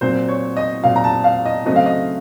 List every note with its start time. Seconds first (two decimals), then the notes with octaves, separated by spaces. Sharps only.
0.01 A#2 F#3 C4 C5
0.28 C#5
0.57 D#5
0.83 A#2 F#3 C4 F5
0.96 A#5
1.04 A5
1.24 F5
1.46 D#5
1.66 C#3 F#3 A3 C4 D#5
1.76 F5
1.86 D#5